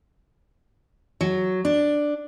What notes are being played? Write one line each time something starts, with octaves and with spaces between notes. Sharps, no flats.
F#3
D4